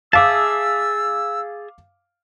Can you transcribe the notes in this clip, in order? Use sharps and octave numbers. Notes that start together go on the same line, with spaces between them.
G#4 E5 F5 A5 D6 E6